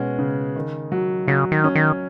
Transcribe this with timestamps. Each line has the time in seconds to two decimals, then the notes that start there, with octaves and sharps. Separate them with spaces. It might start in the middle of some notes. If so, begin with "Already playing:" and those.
Already playing: B2 G#3 C#4 F#4
0.19 C#3
0.56 D#3
0.92 F#3
1.27 C#3 F#3
1.52 D#3
1.64 C#4
1.75 D#3